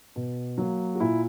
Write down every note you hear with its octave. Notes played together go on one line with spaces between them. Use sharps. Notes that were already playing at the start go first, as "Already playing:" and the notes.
B2
F#3 A#3
F#4
A#2 E4